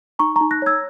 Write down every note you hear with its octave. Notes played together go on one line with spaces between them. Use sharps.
D#4 A#5 C#6
A#5 C#6
D#4
F#6 A#6
C#5 E6 G#6